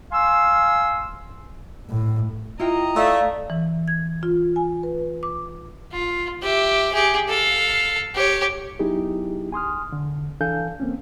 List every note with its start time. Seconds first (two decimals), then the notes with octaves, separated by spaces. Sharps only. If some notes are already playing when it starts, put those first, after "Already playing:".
0.12 F5 G#5 C6 E6
1.90 A2
2.60 E4 F4 D#5 G5 A#5
2.96 A3 D5 F5 E6
3.50 E3
3.88 G#6
4.23 F4
4.56 G#5
4.83 B4
5.23 D6
5.92 F4
6.42 G4 E5
6.93 G4 G#4
7.28 A4 F5
8.15 G4 C#5
8.79 F#3 B3 D#4 E4 G4 G#4
9.52 G#5 C6 D#6 F6
9.90 E2 D3
10.41 E3 D4 A4 F5 G#5 G6
10.80 A#3 C4 C#4